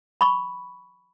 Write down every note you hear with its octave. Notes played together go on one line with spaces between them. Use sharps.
B5 C#6